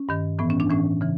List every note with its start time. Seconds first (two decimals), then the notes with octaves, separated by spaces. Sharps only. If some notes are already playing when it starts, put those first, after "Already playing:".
Already playing: C#4
0.09 G2 D#3
0.39 A2 E3 B3
0.50 C#4
0.60 D4
0.69 A2 E3 C#4
1.01 C#3 E3